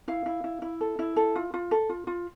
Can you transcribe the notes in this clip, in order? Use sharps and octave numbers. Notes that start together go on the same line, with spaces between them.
E4 F5
E4
E4
E4
A4
E4
A4
F4
F4
A4
F4
F4